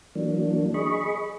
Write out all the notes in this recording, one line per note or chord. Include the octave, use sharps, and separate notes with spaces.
E3 F#3 A#3 D4
G#4 D#5 B5 C#6